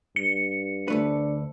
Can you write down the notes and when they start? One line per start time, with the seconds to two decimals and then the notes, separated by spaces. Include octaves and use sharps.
0.16 G2 C#7
0.88 D2 A3 D4 B4